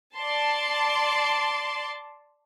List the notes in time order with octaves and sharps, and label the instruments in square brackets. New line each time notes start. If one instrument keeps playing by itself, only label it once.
[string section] D5 A5 C6